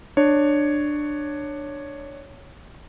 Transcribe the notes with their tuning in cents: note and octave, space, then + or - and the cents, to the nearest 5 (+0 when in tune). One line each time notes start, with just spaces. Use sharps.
D4 +15 C#5 +0